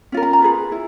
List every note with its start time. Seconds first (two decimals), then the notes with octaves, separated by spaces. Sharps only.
0.12 C#4 F4 A#4
0.23 A#5
0.33 A#5
0.42 F4 G#4 B4
0.72 E4